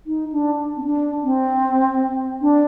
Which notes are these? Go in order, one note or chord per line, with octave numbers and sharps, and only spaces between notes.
D#4
D4
C4
D4
C4
D4